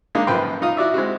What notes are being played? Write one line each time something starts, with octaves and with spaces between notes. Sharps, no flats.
G#3 A#3 D4 D#4
A#1 F#2 F3 B4 G5 C6
D#4 F4 D#6
E4 F#4 D5 E5
G#3 C4 E4 F#4